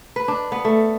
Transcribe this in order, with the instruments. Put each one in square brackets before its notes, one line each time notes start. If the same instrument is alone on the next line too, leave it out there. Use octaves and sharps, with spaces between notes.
[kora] B4
D4
B3
A3